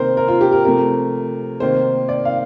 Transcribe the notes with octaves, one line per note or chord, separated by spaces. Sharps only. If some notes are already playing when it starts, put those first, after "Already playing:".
Already playing: C3 D#3 A#3 A#4 C5
A#4
F4
G4
A#4
C3 F3 A3 A#4
C3 D#3 A#3 C5
D5
F5